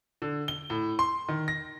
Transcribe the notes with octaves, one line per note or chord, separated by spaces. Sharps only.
D3
G7
A2
C6
D#3
A#6